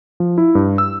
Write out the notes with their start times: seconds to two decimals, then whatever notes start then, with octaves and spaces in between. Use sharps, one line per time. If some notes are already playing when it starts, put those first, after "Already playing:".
0.20 F3
0.38 E4
0.55 G2
0.78 E6